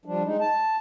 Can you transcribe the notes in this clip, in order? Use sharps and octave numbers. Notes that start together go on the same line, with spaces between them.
F3 G3 D4
G#3 D#4
A5